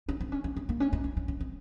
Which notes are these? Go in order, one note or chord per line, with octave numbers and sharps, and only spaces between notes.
C#4
C4
C#4
C#4
C4
A#3
C#4
D#4
D#4
C#4
C#4
C4